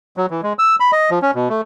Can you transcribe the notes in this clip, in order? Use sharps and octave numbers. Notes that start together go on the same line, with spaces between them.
F#3
E3
G#3
E6
B5
D#5
F3
C#4
B2
A3